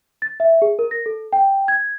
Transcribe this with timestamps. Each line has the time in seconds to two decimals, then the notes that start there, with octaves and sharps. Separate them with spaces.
0.22 A6
0.40 E5
0.62 G#4
0.79 A#4
0.91 A#6
1.06 A4
1.33 G5
1.68 G#6